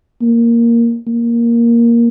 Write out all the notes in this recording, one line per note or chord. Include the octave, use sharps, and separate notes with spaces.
A#3
A#3